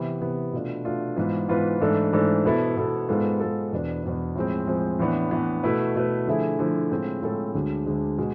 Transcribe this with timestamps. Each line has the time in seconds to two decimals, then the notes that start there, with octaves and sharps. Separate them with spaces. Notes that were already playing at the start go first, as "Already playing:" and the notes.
Already playing: C3 E3 B3
0.21 C3 E3 B3
0.53 B2 A3 D4 F4
0.85 B2 A3 D4 F4
1.16 G#2 E3 B3 F4 B4
1.49 G#2 E3 B3 F4 B4
1.81 G#2 E3 A3 D4 A4
2.13 G#2 E3 A3 D4 A4
2.45 B2 B3 E4 A4
2.77 B2 B3 E4 A4
3.09 G#2 G#3 B3 F4 A4
3.40 G#2 G#3 B3 F4 A4
3.72 E2 B2 B3 D4
4.03 E2 B2 B3 D4
4.35 A2 F3 G#3 C4
4.67 A2 F3 G#3 C4
4.99 A2 E3 B3 D4
5.31 A2 E3 B3 D4
5.63 B2 A3 E4 B4
5.95 B2 A3 E4 B4
6.27 D3 F3 A3 E4 G#4
6.59 D3 F3 A3 E4 G#4
6.91 A2 G#3 C4 F4 A4
7.22 A2 G#3 C4 F4 A4
7.55 D2 D3 G#3
7.86 D2 D3 G#3
8.18 B2 G#3